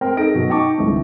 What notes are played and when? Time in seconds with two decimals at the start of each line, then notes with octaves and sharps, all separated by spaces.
0.01 C4 A#4 C5 G5
0.17 D#4 G#4 A4 A#6 D7
0.34 F#2 B2 F#4
0.49 D#4 G5 A5 C#6 D6
0.78 C2 D3 E3 C4